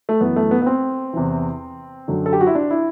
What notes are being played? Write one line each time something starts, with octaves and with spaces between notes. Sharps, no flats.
A3
F#2 E3 B3
A3
B3
B3
C4
E2 C3 E3
F#2 D3 F#3
A4
G4
F#4
E4
D4
E4